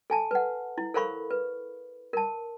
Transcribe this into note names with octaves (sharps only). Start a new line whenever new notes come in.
A4 G#5 A5
B4 F#5
E4
A4 A#4 C5 F5 B5 C#6
B4
A#4 A5